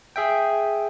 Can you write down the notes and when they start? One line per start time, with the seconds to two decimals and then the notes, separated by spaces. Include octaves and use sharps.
0.16 G#4 E5 G5